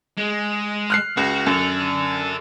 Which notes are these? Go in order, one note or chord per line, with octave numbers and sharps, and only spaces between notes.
G#3
F6 F#6 C7
C#2 F#4
F#2 A4 D5